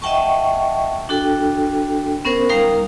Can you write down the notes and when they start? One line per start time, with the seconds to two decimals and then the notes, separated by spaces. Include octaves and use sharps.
0.02 D#5 E5 F#5 G5 A5 C#6
1.09 D4 F#4 A4 G5
2.25 B3 C#4 A#4 C5
2.49 G3 D#4 A#4 F5 A#5